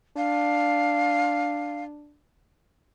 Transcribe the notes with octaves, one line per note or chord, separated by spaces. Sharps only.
D4 F5